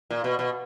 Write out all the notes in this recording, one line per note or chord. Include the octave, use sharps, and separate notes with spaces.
A#2
B2
B2